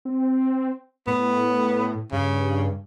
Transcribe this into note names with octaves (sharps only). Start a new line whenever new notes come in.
C4
A2 B3
G2 C#3